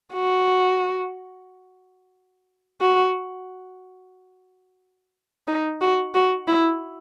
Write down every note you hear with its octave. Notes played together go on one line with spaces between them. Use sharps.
F#4
F#4
D#4
F#4
F#4
E4